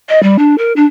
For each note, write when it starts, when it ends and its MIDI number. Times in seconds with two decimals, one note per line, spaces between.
0.09 0.22 75
0.23 0.36 55
0.38 0.55 62
0.58 0.73 70
0.76 0.85 62